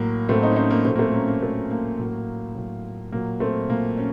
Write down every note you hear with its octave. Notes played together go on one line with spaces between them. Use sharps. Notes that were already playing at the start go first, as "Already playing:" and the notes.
Already playing: A2 F#3 A#3
A2 F#3 A3 C4
C4 D#4
C#4
C4 D#4
A#3 C#4
A#2 F#3 A3 C4
A#3
A3 C4
A#3 C#4
A#3
A#2 F#3 A3
A#3
A2 F#3
A2 F#3
A#2 F#3 A#3
A3 C4
A#2 F#3 A#3
C#4